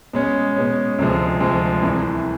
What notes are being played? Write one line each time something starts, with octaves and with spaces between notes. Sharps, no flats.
B2 G#3 C#4
B2 G#3 C#4
D2 C3 F3 G#3
D2 C3 F3 G#3
C2 C3 E3